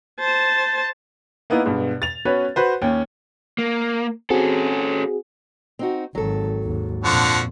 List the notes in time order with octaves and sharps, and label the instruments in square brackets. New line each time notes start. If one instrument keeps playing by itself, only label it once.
[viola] C5 A5
[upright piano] A#3 B3 D#4 E4 A#4
G2 B2 G#3
A6 F7
B3 C#4 F#4 B4 C#5
F#4 B4 C5
D#2 C#4 G5
[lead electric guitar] A#3
[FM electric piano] C4 F#4 G#4 [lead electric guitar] C#4 A4
[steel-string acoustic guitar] C4 D#4 F#4
[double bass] G#1 D#3 [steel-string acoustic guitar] F#3 A4
[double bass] D#2 G#2
[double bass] F2 A#2 [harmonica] D3 F3 F#4